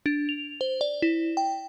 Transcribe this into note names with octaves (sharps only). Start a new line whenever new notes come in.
D4
F7
C5
D5
E4
G5